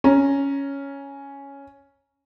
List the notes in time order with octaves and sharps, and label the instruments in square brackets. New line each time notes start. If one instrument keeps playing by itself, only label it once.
[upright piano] C#4 A#5